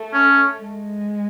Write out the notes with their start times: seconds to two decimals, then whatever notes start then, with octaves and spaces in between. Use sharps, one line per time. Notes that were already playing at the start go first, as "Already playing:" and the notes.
Already playing: A3
0.13 C#4
0.61 G#3